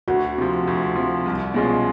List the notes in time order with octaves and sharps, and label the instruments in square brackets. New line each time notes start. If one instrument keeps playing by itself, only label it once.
[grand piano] D2 [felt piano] F#4
[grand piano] C3 F3
D2
C3 F3
C2
B2 G#3 C#4 F4